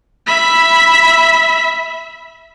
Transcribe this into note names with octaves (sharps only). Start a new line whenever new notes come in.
E5 B5